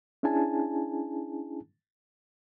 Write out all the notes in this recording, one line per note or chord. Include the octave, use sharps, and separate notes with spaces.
C#4 D4 E4 G#4 G#5 A5